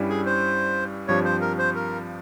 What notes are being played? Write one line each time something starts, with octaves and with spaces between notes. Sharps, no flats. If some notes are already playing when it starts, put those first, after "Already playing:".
Already playing: G2 G3 C#4 E4
G#4
C5
G2 F3 C4 G4 C#5
C5
A#4
C5
A#4